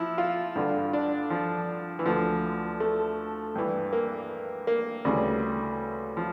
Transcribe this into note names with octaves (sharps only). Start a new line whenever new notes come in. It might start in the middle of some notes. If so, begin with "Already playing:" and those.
Already playing: F3 E4
F4
G2 D3
D4
F3
E3
D2 D3 F3
A3
G2 E3
A#3
A#3
D2 C#3 E3 G3
F3